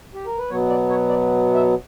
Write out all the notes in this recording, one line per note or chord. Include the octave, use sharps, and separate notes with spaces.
G4
A#4
B4
B2 F#3 B3 C#5
D5
C#5
D5
E5